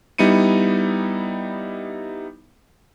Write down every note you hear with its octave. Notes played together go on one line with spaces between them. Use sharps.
G3 B3 D#4 E4 C#7 D#7